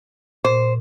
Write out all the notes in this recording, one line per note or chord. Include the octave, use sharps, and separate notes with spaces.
A#2 C5